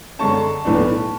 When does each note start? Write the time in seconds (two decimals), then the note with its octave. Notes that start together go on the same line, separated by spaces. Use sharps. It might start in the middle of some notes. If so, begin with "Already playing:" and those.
0.19 F#2 D3 G#3 C#4 A5 C#6
0.65 B1 A2 E3 B3 D4